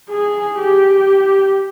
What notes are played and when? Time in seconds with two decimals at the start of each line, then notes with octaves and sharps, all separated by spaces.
0.10 G#4
0.59 G4